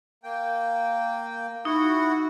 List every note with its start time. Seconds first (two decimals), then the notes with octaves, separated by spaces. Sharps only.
0.24 A#3 G5
1.65 D#4 E4 F#4 F#5